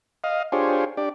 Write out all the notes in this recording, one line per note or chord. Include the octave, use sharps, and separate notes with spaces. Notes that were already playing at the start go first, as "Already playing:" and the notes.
D#5 F5
D4 F4 G4 G#4 C5 C#5
D4 G4 D5